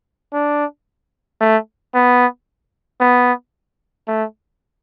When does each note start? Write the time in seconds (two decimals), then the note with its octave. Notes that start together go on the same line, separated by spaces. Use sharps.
0.33 D4
1.41 A3
1.94 B3
3.00 B3
4.08 A3